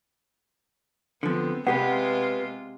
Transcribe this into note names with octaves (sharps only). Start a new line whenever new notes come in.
D3 F3 B3 C4
C3 G#3 B3 F4 G4 B4 F#5